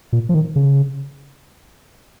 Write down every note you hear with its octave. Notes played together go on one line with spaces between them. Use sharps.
A#2
F3
D#3
C#3